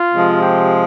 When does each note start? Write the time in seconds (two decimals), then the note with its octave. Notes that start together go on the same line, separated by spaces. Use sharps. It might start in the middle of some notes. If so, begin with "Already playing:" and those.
Already playing: F4
0.13 C3 F3 G#3
0.42 G4